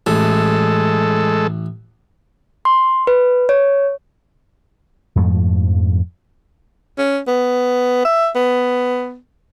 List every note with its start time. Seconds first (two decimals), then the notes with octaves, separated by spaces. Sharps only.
0.06 A1 E3 G#3 A4
2.65 C6
3.07 B4
3.49 C#5
5.16 F2 G#2 F3 A3
6.98 C#4
7.28 B3
8.05 E5
8.36 B3